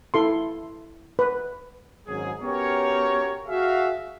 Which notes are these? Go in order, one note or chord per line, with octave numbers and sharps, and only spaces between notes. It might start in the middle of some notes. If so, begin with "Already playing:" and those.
E4 A4 C6
B4
G#1 G#2 F#3 C#4 G#4
B3 C#4 F#4 G4 A#4 C#5
F#4 G#4 E5 F5